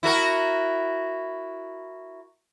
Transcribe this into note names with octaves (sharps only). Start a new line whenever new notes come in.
E4 F#4 A#4